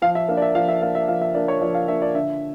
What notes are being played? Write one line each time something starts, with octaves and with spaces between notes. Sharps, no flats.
F3 F5
E5
A#3 D4 F5
D5
E5
F3 F5
E5
A#3 D4 F5
E5
F3 F5
E5
A#3 D4 D5
C#5
F3 D5
F5
A#3 D4 E5
D5
D3 E5